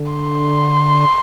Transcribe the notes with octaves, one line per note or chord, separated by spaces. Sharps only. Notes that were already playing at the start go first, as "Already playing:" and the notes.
Already playing: D3
C6